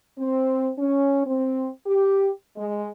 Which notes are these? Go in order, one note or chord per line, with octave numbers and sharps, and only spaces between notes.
C4
C#4
C4
G4
G#3